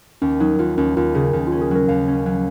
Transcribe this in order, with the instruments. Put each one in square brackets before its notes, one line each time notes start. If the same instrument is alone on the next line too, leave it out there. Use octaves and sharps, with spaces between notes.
[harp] D#2 [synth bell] C#4
[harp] F#3 [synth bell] D#4
[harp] D#2 [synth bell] F4
[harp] D#2 [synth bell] C#4
[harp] D#2 [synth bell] F4
[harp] C#3 [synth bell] G#4
[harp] D#2
[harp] C#4 [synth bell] F4
[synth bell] G#4
[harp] F#3 [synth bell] A#4
[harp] D#2 [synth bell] F5
[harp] C#4
F#3